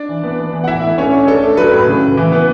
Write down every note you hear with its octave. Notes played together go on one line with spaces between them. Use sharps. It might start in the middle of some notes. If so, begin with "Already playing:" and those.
Already playing: D4 D5
E3
B3
B3
E3
F#5
A2 E4 E5
A3
C#4 D4 C#5
D4
A3 A4
D4
F#3 B4
A2
C#3
C#3
E3
B3